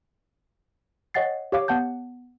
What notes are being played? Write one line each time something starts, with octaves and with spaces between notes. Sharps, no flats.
C#5 D#5 F#5 G5 A6 C7
G4 C#5 F5 D6
B3 F#5 A5 G6